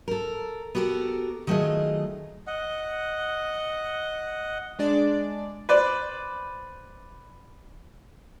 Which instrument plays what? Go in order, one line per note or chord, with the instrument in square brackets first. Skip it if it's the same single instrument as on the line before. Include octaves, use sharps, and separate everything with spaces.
[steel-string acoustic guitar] A4 A#4
B3 F#4 G4 A4 A#4
D#3 F#3 A3 F4 G#4 D#5
[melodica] D#5 F#5
[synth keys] G#3 D4 D5
[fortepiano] B4 C5 D5